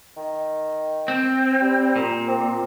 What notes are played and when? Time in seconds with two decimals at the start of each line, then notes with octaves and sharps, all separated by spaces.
0.17 D#3
1.08 C4
1.61 G3
1.96 A#2
2.28 C4